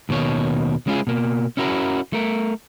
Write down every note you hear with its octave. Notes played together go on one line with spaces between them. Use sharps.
D#2 B2 D#3 C#5
G#3 C#4 E4 F4 G4 G#4
B2 A#3
C#4 E4 F#4 A#4
A3 A#4